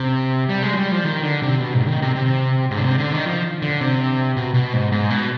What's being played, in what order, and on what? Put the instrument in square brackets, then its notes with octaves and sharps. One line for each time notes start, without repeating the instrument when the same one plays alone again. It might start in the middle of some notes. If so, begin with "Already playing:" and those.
Already playing: [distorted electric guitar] C3
G3
G#3
F3
G3
F3
D#3
D3
C3
B2
G#2
D#3
C3
C3
G#2
D3
C3
D3
D#3
F3
D3
C3
B2
B2
G#2
G#2
B2